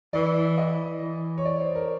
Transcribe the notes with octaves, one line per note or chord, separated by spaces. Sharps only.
E3 D5
D#5
E3
C#5
D5
C5
A#4